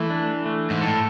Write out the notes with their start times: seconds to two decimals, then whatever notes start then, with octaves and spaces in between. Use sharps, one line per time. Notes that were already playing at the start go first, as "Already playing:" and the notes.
Already playing: E3 A3
0.10 D4
0.46 A3
0.70 G#2
0.81 A2 A4